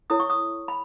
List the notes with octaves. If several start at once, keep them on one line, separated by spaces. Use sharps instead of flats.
E4 A4 C#5 D#6
C#6
D#6
B5